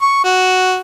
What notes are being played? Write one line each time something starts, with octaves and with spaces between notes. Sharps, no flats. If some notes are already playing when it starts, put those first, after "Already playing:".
C#6
F#4